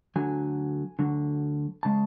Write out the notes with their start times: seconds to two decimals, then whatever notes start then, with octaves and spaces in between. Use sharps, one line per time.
0.16 D2 D3 F#3 G#5
0.99 D2 D3 F#3
1.83 C#3 G#3 A5